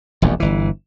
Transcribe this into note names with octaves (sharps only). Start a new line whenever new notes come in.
E1 A#1 D#2
G1 E3